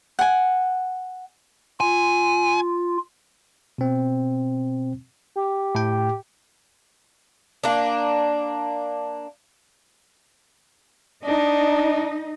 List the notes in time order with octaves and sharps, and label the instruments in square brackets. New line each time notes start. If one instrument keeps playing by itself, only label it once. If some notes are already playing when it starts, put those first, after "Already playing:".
[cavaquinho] F#5 G#5
[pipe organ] F4 [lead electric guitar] G#5
[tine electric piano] B2 C4
[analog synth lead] G4
[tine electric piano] A2 G5
[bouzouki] A#3 D4
[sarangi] D4 [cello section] D#4 D#5